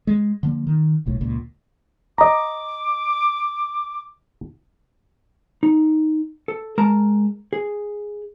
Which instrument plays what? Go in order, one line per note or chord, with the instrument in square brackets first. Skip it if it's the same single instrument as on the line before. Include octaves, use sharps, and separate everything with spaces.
[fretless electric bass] G#3
D3 F3 A#3
D#3
E1 B1 A2
C#2 A#2
[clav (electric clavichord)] D#5 A#5 [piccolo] D6
[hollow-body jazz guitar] D#4
A4
G#3 A#4 A5 A#5
G#4